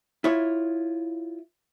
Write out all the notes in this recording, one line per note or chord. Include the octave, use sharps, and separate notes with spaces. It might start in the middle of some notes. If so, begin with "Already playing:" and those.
E4 F4 C#5